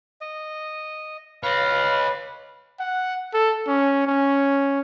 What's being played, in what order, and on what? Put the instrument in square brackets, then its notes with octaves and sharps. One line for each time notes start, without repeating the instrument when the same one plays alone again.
[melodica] D#5
[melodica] B4 [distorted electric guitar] C#5 D#5 [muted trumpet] F5
[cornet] F#5
A4
C#4
C#4